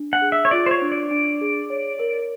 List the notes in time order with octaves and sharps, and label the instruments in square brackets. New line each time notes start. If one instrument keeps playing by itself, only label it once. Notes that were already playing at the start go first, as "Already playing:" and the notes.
Already playing: [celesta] D4
[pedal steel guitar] F#5
[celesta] G#4
[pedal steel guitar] E5
C#5
[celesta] F4 [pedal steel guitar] D5
[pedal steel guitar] C5
C#5
[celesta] D4
[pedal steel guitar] D5
[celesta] D4
G#4
C#5
A#4